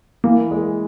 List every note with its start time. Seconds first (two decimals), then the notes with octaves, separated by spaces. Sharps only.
0.24 E3 A#3
0.51 G#3